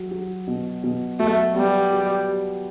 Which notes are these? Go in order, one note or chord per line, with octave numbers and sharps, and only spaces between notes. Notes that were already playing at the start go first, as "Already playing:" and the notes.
Already playing: F#3
F#3
B2
B2
F#3 A3
G3 B3
F#3